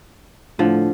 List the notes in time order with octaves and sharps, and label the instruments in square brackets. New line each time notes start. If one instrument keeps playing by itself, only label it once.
[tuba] A2 [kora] D3 F3